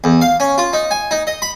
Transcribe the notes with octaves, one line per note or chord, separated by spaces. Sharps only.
E2
F5
C#4
F4
D#4
G#5
D#4
D#5
B5